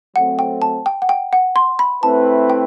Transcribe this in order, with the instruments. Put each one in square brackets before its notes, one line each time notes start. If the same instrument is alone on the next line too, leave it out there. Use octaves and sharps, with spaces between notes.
[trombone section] F#3 A3 C4 [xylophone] F#5
[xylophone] G5
A5
G5
F#5
G5
F#5
C6
B5
[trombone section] A3 C4 E4 B4 [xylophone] A5
[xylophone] G5